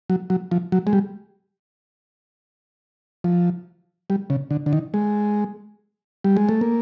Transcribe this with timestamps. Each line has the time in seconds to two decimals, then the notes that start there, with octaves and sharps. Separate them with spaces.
0.10 F#3
0.30 F#3
0.51 F3
0.72 F#3
0.87 G#3
0.93 G3
3.24 F3
4.10 G3
4.30 C#3
4.51 D3
4.66 D3
4.73 D#3
4.94 G#3
6.25 G3
6.37 G#3
6.49 A3
6.61 A#3